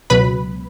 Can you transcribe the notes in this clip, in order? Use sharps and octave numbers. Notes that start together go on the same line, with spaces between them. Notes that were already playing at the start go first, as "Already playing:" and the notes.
C#2 B2 F#3 B4 B5